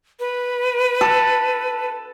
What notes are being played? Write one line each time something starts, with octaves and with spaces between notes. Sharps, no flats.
B4
A4